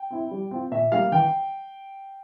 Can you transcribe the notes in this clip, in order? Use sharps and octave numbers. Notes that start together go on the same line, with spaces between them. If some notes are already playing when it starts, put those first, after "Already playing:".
Already playing: G5
C4 E4
G3
C4 F4
A#2 E5
G3 A#3 F5
E3 G5